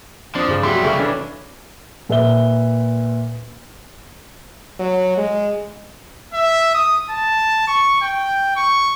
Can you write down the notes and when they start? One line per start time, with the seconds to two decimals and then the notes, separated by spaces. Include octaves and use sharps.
0.35 F3 C4 D4 D#6
0.48 G2 C#3 D4
0.63 F#3 G3 E4 G4 G#4 C6
0.84 C2 C#3 A4 C#6
0.99 E3 C#4 D4
2.09 A#2 B4 E5 G7
4.79 F#3
5.17 G#3
6.34 E5
6.74 D#6
7.10 A5
7.68 C#6
8.01 G5
8.56 C#6